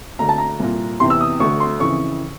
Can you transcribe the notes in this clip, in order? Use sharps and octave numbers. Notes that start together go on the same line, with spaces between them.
D2 D3 A#5
A5
A#5
C2 A#2
E2 C3 E3 C6
E6
D#6
D2 D3 C#6
C6
F2 C#3 E3 C#6